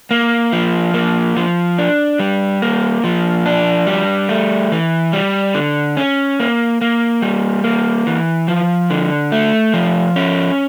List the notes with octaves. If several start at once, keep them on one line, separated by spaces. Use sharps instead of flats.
A#3
F3
A#3
F3
D4
G3
A#3
F3
D4
G3
A3
E3
G3
D3
C#4
A#3
A#3
G3
A#3
E3
F3
D3
A3
F3
C#4